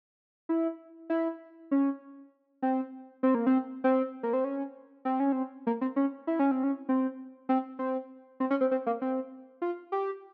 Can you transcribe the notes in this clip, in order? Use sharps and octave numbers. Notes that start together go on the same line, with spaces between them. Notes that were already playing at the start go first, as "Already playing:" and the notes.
E4
E4
C#4
C4
C4
A#3
C4
C4
A#3
C4
C#4
C4
C#4
C4
A#3
C4
C#4
E4
C#4
C4
C#4
C4
C4
C4
C4
C#4
C4
C4
A#3
C4
F4
G4